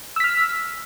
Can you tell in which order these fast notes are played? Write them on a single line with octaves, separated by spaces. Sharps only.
E6 B6 F6